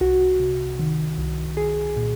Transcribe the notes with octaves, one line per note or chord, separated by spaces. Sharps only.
C2 F#4
C3
D#3
C2
C2 G#4
A#2